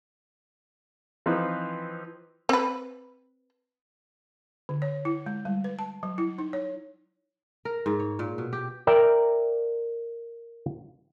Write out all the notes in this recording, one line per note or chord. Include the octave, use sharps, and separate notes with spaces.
E3 F3 C4 D#4 B4
C4 B4
D3
C#5
E4
G#3
G3
B4
A5
F#3
E4
D#4
C#5
A#4
G#2
C#5
A#2
B2
G4
A#4 D5 E5 G5